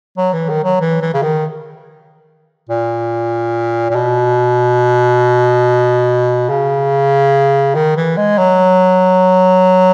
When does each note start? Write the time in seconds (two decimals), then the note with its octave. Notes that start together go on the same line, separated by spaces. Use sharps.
0.17 F#3
0.33 E3
0.49 D#3
0.64 F#3
0.81 E3
1.01 E3
1.14 C#3
1.23 D#3
2.69 A#2
3.90 A#2
3.96 B2
6.49 C#3
7.75 D#3
7.97 E3
8.17 G#3
8.38 F#3